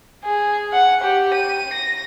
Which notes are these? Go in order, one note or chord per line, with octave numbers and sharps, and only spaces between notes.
G#4
F#5
G4
D#7
A#6